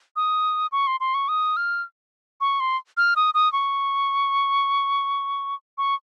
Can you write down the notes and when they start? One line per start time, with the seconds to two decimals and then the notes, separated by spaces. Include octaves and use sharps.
0.16 D#6
0.72 C#6
0.87 C6
1.00 C6
1.14 C#6
1.28 D#6
1.57 F6
2.41 C#6
2.60 C6
2.97 F6
3.16 D#6
3.34 D#6
3.53 C#6
5.78 C#6